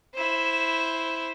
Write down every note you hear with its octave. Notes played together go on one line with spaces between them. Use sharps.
E4 C5